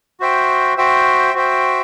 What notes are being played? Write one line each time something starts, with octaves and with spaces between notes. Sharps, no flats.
F#4 C5 E5 G5
F#4 C5 E5 G5
F#4 C5 E5 G5